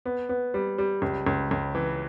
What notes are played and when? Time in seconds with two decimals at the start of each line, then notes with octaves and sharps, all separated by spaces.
0.05 B3
0.29 B3
0.54 G3
0.78 G3
1.02 C#2
1.27 C#2
1.51 C#2
1.75 E3